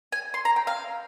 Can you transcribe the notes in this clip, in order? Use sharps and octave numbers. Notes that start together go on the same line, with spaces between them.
G#5
C6
A#5
G5
F5